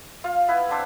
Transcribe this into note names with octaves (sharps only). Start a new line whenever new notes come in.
F4 F5
B3 E4 B4
B3 C4 D4 C5